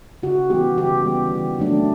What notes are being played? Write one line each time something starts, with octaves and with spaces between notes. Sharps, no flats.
C#3 F#4
E3 G3 B3 G4
C#3 G4
E3 G3 B3
D#3
F#3 A3 D4